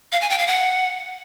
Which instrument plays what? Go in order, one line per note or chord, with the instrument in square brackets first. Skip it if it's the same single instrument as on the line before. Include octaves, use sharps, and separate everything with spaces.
[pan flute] F5
G#5
G5
F5
F#5